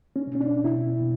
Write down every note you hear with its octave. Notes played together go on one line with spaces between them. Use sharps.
C#4
B2
C#4
D4
B2 E4
B2